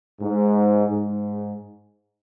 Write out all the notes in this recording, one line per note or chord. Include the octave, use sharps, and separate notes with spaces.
G#2
G#2